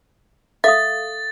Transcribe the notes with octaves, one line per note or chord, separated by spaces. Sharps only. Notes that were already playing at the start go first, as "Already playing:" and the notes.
A4 E5 F5 D#6 A6